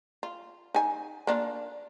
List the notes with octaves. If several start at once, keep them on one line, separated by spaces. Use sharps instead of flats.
F4
D#4 G#5
A#3 D4 F4